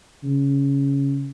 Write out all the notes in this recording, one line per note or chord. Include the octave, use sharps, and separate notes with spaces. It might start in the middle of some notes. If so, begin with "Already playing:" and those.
C#3